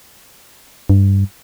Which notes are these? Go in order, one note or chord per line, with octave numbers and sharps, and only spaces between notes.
G2